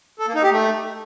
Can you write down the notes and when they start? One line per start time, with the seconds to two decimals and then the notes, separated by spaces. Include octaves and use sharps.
0.19 A4
0.27 A#3
0.35 D#4
0.43 G4
0.51 A3